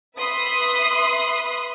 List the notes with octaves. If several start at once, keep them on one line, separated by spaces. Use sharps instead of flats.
B4 E5 B5 C6 D#6